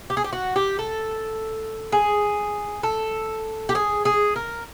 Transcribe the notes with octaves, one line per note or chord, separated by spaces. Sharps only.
G4
G#4
G4
F#4
G4
A4
G#4
A4
G4
G#4
G#4
A#4